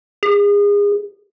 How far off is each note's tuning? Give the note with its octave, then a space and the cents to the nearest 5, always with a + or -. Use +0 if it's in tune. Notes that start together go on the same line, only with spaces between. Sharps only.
G#4 -30